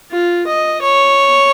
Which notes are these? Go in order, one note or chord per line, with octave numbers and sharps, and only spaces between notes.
F4
D#5
C#5